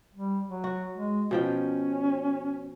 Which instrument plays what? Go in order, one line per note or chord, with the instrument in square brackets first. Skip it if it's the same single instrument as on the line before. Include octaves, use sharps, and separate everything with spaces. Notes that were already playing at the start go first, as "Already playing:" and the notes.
[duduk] G3
F#3
[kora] F#4
[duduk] G#3
[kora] B2 F3 G5 [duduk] C#4